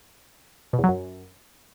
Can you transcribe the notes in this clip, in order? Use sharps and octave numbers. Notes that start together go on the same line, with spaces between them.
B2
E2
F#3
F#2